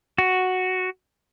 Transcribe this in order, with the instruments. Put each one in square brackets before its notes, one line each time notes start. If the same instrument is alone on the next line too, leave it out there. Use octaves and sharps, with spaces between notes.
[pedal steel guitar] F#4